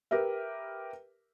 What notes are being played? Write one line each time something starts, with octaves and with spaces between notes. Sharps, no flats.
G4 A#4 B4 E5